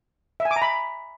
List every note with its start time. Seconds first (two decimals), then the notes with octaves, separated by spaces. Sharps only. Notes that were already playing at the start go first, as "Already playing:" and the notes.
0.40 E5
0.45 G#5
0.51 D6
0.56 A#5
0.62 B5